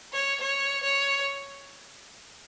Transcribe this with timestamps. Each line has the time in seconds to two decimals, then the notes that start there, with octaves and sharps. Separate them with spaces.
0.13 C#5
0.41 C#5
0.83 C#5